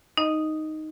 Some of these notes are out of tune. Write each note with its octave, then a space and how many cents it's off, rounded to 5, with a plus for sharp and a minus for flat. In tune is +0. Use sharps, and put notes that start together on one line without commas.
D#4 +0 D#5 +0